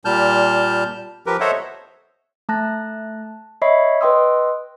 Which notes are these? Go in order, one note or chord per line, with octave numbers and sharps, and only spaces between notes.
A#2 G3 A5 F6 G6
F3 G4 A#4 B4
A4 C5 C#5 D#5 E5 F#5
A3 A5 F#6 A#6
C#5 D#5 E5 B5 C#6 C7
B4 D#5 G5 C6 D#6 E6